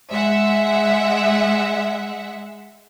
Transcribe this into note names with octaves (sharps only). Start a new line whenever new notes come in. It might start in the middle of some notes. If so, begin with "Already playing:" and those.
G#3 E5 F#5